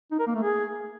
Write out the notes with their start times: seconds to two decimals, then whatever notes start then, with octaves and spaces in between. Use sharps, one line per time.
0.11 D#4
0.19 A#4
0.27 A#3
0.35 A3
0.43 G#4